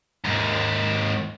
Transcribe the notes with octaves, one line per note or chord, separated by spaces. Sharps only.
D#2 G#2